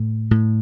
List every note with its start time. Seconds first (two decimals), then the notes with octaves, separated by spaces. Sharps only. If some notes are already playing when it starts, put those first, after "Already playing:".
Already playing: A2
0.31 A2